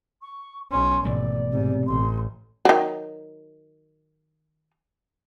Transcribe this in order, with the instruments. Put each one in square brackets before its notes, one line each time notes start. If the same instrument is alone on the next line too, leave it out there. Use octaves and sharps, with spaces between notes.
[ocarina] C#6
[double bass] B1 C#4 [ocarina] C6
[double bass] G#1 [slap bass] B2 E3 A3 [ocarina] D5
[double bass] G#2 [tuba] C3
[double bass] A1 [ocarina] C6
[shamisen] D#3 F#3